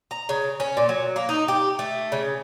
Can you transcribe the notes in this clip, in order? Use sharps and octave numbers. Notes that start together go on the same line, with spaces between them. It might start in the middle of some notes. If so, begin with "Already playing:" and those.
A#5
C#3
C#4
A#2
F#3
A#3
D#4
G4
A3
C#3